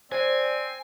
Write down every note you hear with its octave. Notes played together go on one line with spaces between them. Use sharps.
C4 C5 D5 G#5